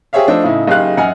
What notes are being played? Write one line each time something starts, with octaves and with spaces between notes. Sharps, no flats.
G4 G#4 C5 C#5 E5 F5
F3 A3 D4 A4 C5 D#5
A2 C#3 D#4 E4
F#1 D#4 G4 G#4 F5 F#6
F#2 D#5 F#5 G#5 F6